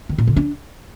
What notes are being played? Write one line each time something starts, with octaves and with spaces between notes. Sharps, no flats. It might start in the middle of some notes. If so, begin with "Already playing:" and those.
D#3
A#2
D3
D4